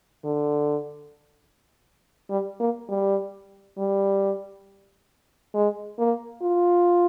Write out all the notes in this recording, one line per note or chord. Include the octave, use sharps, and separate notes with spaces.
D3
G3
A#3
G3
G3
G#3
A#3
F4